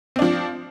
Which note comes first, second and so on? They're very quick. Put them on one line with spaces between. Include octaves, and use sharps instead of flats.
C4 D4 F3